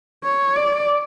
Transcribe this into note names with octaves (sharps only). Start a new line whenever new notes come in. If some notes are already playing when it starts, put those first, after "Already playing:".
C#5
D5